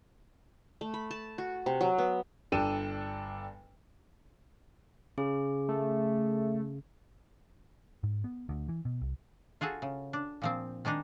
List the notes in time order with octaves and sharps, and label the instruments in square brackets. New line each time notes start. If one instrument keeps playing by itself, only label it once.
[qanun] A3
B5
A5
F#4
C3
F#3
B3
[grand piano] G1 D4 A4 G5 D#7 E7
[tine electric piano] C#3 [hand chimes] G#4
[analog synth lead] A3
[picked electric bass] G#2
B3
D2
E3
B2
C2
[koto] F4 F#4 G#4 A4
C#3
D4
A#2 F3 C4
D#3 G#3 D4 D#4